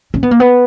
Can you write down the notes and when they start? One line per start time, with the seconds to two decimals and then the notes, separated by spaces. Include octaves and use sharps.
0.14 C#4
0.23 B3
0.31 A#3
0.40 B3